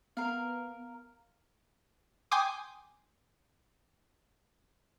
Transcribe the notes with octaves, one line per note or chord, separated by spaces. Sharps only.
B3 A#4 F5
G5 G#5 C6 D6 D#6